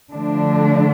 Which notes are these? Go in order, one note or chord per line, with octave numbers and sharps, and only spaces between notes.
D3 F3 A3 D4